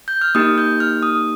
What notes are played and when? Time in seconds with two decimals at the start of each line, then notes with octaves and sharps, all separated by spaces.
0.08 G6
0.21 F6
0.35 A#3 D#4 G4 D#6
0.58 G6
0.80 F6
1.03 D#6